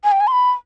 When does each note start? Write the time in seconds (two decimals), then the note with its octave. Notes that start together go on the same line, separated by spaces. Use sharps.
0.04 G#5
0.12 G5
0.20 G#5
0.27 C6
0.32 B5